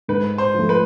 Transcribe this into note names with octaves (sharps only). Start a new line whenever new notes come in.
G#2 B4
C5
F3 A3
B4